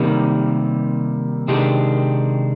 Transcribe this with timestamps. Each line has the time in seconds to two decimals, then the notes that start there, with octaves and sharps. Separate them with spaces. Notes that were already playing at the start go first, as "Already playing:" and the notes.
Already playing: C3 D#3 G3 A#3
1.48 C3 D#3 G#3 D4 G4